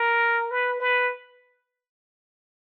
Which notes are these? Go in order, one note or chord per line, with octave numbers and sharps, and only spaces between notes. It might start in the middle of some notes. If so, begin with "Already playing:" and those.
Already playing: A#4
B4
B4